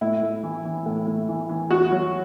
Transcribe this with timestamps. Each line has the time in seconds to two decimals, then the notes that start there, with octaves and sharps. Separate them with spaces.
0.01 A2 E4
0.23 A2
0.43 E3
0.65 E3
0.86 A2
1.07 A2
1.29 E3
1.49 E3
1.70 E2 F#4
1.92 F#3